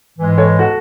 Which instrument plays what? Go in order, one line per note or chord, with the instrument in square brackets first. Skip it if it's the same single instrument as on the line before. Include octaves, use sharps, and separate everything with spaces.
[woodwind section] G#2 E3 G#3
[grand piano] A4 C#5
F#4 A4